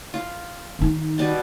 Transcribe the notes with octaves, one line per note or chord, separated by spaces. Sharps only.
F4
D#3 D#4
B2 G3 B4